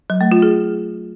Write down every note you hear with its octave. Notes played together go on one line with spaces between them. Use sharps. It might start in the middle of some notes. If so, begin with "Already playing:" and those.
F#3
A3
F4
G#4